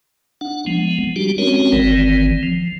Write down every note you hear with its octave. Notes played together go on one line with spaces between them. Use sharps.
D4 F#5
F3 G#3 B3
G3 D4 F#4 G4
G#3 C4 C#4 F#4 A#4 C#5
G1 D#3 E3 C4
F3